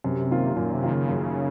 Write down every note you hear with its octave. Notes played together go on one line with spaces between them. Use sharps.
F#2 C3
D#3 A#3 F4
F#2 A#2
C3
D#3 A#3 F4
C#3
F#2
D#3